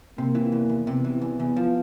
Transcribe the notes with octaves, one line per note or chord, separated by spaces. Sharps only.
C3 A#3
E3
E2
E2
C3 B3
E3
E2
E2
F3